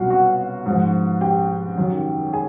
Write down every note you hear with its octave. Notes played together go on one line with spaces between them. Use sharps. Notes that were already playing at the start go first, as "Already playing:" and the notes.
Already playing: C2 B2 F#3 F4 F#4 F5 F#5
F#4 F#5
G#2 F3
G4 G5
F#2 D#3 F#3
G#4 G#5